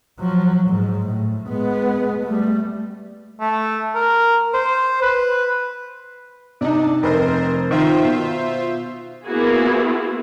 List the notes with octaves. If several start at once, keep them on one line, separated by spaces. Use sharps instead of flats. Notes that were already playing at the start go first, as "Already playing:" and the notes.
F3 F#3
G#2
A2
G#3 B3
G3 A3
A3
A#4
C5
B4
C3 D4 D#4
F1 A#4 C5
D#3 F4 C5 E5
B2
A#3 B3 E4 F#4 G#4